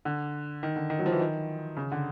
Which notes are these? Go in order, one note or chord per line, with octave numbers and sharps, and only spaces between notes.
D3
D#3
D3
D#3
F#3
F3
E3
D#3
C#3
D3